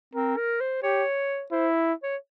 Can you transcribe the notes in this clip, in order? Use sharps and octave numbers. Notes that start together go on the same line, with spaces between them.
C4 A#4
A#4
C5
G4 C#5
E4 C5
C#5